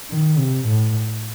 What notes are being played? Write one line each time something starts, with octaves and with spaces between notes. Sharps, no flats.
D#3
C3
A2